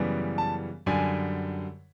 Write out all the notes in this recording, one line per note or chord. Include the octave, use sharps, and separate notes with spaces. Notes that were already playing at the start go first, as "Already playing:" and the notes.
Already playing: F#2 C#3 E3 G3 B3
A5
F#2 D3 G3 G#5